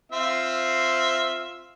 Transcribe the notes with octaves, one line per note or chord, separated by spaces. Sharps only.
C4 F4 E5